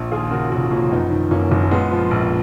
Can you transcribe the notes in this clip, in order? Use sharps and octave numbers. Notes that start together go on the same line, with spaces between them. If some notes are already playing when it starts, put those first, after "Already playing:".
Already playing: A#1
D#2 F4 G#4
C#3 F#4 A#4
F1 F#4 A#4
F3 A#3 C#4
F#2 B3 D#4
D#3
F#1 A#3 C#4
F#1
A#2 G#3 B3
F3
A#1